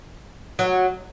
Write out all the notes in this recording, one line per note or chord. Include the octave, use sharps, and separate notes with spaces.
F#3